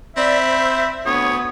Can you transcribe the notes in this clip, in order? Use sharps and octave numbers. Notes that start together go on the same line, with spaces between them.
C4 D5 E5 B5
C5
D2 B3 C#5 D#6